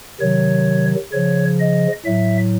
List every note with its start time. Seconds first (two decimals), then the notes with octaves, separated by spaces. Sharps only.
0.21 C3 D#3 F#3 C#5
1.13 C#3 F3 C#5
1.60 D#5
2.05 A2 F#3 E5